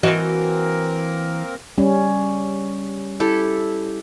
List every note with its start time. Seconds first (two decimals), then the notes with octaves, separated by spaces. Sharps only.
0.03 E3 A#3 C4 F#4 A#4 D#5
1.78 G3 C#4
3.20 E4 G4 A4